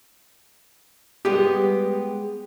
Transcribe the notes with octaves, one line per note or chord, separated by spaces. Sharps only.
G3 G#3 B3 G4